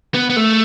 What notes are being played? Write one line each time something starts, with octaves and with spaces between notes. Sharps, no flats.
B3
B3
A3